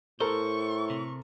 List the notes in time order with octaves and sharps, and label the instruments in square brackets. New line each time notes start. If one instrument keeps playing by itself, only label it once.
[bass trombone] A2 [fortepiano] A4 A#4 [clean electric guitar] C5 [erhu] C#6
[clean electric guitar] C3